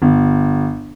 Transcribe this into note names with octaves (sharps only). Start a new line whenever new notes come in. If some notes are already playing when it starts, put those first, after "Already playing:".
G1